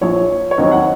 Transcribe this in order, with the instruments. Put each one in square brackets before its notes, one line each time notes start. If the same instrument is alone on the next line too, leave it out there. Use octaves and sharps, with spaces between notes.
[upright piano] A#1 A#2 F3 C#5
C#5
D#2 D#3 F#3 C4 D#5
F#5